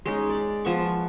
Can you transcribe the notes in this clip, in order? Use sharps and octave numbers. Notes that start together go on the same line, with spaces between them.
G#3 C#4 D#4
D5
F3 B3 C#6